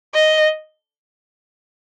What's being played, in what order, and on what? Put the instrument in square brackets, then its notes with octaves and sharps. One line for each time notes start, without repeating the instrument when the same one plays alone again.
[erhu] D#5